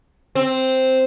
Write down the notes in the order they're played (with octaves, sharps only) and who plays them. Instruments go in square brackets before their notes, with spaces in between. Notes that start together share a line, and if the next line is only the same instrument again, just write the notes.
[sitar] C4